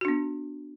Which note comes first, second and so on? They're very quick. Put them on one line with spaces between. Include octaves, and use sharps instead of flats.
F#4 D4 B3